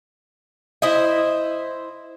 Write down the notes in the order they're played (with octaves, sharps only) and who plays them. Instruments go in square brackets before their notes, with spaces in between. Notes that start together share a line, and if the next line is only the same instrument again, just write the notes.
[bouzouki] E4 C5 D#5 E5